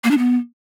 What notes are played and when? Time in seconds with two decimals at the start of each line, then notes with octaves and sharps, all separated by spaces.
0.04 A#3
0.11 D4
0.18 B3